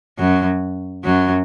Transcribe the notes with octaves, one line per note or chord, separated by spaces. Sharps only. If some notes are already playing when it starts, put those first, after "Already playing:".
F#2 F#3
F#2 F#3